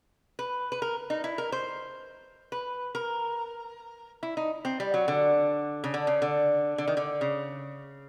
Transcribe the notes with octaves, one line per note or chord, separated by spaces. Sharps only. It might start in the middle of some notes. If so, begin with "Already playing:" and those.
B4
B4
A#4
D#4
E4
A#4
C5
B4
A#4
E4
D#4
C4
G3
F#3
D3
C#3
D3
C#3
D3
D3
D#3
D3
C#3